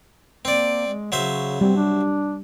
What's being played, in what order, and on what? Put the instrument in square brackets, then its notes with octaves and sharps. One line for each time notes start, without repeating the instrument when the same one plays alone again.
[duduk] A#3 [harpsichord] C4 D5
[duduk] G#3
[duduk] C#3 [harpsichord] F#3 C5 E5
[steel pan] G3 [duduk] C4
[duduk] D4